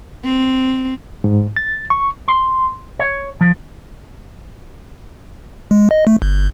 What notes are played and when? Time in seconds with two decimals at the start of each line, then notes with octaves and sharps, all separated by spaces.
0.25 C4
1.24 G#2
1.56 A6
1.90 C#6
2.28 C6
2.99 C#5
3.41 F3
5.71 G#3
5.91 D#5
6.07 A3
6.22 G1